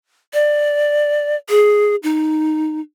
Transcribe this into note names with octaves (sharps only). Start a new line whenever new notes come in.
D5
G#4
D#4